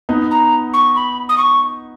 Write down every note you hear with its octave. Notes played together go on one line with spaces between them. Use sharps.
B3 D#4
A#5
C#6
B5
D#6
C#6